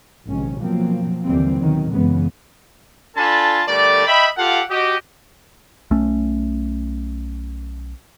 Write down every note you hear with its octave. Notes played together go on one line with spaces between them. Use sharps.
A#1 G#2 C3 D#3 C#4
B2 F3 F#3 A#3 C4
D#2 D3 E3 G3 C4
B2 D#3 F#3
F#2 C#3 E3 G#3 B3
D4 F4 A4 G#5 A5 B5
D3 G3 A3 A#4 D5
D#5 E5 G5 B5
F4 G4 A4 F5 F#5
F#4 G4 D#5
B1 A3 C#4